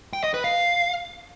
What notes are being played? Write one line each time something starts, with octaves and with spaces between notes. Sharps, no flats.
G5
D#5
B4
F5